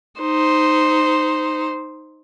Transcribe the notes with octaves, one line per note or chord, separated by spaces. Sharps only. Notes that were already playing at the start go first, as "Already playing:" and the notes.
D#4 C5